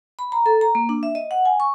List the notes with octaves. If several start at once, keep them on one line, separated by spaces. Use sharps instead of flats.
B5
A#5
A4
A#5
A#3
D4
E5
D#5
F#5
G#5
C#6